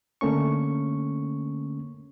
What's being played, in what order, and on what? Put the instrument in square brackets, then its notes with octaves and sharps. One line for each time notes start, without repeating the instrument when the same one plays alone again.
[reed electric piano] D3 A3 A#3 C#4 C#6